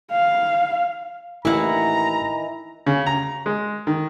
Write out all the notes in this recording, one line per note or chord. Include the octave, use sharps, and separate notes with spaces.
F5
A1 D#3 E3 A#3 E4 E5 F#5 A#5
C#3
A#5
G#3
D#3